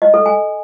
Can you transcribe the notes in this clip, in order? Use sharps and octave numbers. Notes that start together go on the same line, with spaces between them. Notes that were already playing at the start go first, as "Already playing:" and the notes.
D#5
A4
G#5